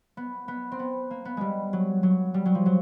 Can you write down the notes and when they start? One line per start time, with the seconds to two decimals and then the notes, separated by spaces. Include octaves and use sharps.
0.17 B3
0.48 B3
0.72 C4
0.79 B3
1.11 A#3
1.25 B3
1.37 G3 G#3
1.73 F#3
2.03 F#3
2.34 G3
2.45 F#3
2.55 F3
2.66 F#3